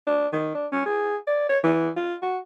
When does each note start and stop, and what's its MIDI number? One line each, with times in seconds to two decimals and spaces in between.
0.07 0.27 62
0.33 0.53 51
0.55 0.67 62
0.72 0.84 61
0.86 1.16 68
1.27 1.48 74
1.49 1.59 73
1.64 1.89 52
1.96 2.15 65
2.22 2.38 66